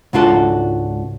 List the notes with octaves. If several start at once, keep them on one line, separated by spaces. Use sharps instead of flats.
C#2 G#2 D4 F4 F#4 A4